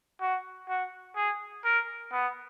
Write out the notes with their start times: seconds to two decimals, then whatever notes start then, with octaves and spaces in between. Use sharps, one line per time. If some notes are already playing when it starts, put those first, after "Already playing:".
0.21 F#4
0.69 F#4
1.16 G#4
1.64 A#4
2.12 B3